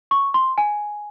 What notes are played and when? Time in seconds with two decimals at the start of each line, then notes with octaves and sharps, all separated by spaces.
0.11 C#6
0.34 C6
0.58 G#5